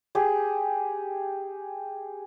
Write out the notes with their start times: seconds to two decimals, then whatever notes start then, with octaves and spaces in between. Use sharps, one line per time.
0.15 G4 G#4